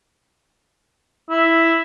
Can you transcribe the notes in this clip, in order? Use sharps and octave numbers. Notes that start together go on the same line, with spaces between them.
E4